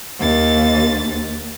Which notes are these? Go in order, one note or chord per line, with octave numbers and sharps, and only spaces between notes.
D#2 A6